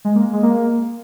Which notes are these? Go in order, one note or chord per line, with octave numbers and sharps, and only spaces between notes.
G#3
A#3
G#3
A#3